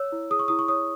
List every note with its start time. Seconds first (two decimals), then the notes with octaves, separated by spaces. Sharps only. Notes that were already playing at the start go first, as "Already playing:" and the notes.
Already playing: C#5 E6
0.12 E4
0.30 G#4 D#6
0.39 C#6
0.48 E4 D#6
0.59 C#6
0.68 C#5 D#6